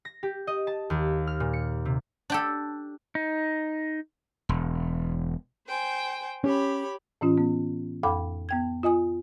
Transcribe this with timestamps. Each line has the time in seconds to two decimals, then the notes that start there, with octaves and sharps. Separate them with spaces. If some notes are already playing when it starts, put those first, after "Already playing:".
0.05 A#6
0.23 G4
0.47 D#5
0.67 A5
0.90 D#2
1.27 F6
1.40 A#2
1.53 C#7
1.85 C3
2.30 D4 G4 A4
3.15 D#4
4.49 E1
5.67 C5 G5 G#5
6.44 C#4 G4 C#5 B5
7.21 A2 E3 C#4 F4
7.38 B3
8.03 F2 A4 F5 G5 B5 D6
8.49 B3 G5 G#6
8.83 F4 D#5 G#5 D#6